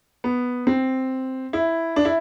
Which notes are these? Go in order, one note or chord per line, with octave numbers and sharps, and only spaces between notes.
B3
C4
E4
D4
E4